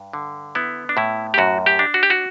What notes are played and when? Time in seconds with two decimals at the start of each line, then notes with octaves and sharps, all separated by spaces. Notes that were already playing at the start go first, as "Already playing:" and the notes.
Already playing: G2
0.13 D3
0.55 B3 E4
0.89 D4
0.97 A2 E4
1.34 G4
1.38 F#2 F#4
1.66 G4
1.79 D4
1.94 F#4
2.03 G4
2.10 F#4